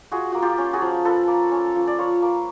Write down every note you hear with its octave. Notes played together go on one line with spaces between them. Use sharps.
F4 F#4 G#4
A#3 F#4
F4 G4
C#4
F#4 G#4
F3
F4 A4 B4
A#3
C#4
F3
D5
F4 B4 C#5
A#3